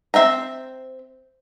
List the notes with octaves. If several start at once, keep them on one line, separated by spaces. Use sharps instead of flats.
C4 E5 G5 A#5